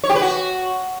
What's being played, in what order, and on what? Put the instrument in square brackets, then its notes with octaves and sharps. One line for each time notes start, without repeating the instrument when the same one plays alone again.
[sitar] C#5
G4
B4
F#4